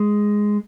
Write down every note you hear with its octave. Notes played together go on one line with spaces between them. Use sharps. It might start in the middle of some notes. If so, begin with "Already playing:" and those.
Already playing: G#3